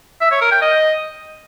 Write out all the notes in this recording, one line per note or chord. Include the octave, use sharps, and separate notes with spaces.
E5
C#5
A#4
G5
D#5